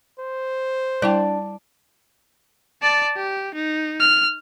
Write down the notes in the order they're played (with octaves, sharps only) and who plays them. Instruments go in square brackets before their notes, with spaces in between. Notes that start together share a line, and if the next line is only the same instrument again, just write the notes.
[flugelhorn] C5
[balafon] G3 E4 G5 [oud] D4
[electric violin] D5 A5
G4
D#4
F6